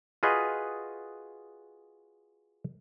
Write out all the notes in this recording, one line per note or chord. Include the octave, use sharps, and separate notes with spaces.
F4 F#4 G#4 B4 D#5